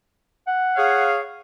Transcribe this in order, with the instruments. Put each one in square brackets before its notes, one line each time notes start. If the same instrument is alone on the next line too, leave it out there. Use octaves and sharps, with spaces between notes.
[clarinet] F#5
[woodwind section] G#4 C#5 F5